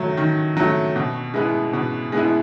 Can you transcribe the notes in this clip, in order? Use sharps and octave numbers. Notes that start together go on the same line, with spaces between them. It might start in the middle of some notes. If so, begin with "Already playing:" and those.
Already playing: D#3 F#3 A3
D#3
F#3 A3
B2
G#3 B3 E4
B2
G#3 B3 E4